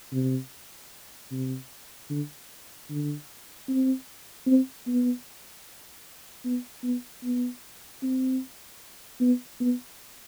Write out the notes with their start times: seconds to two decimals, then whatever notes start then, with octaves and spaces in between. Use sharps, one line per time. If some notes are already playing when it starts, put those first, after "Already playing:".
0.13 C3
1.31 C3
2.10 D3
2.90 D3
3.68 C4
4.47 C4
4.87 B3
6.45 B3
6.83 B3
7.24 B3
8.03 C4
9.21 B3
9.61 B3